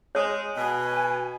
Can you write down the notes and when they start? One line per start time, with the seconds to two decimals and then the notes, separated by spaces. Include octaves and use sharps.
0.15 G#3 C#5
0.57 B2 G#5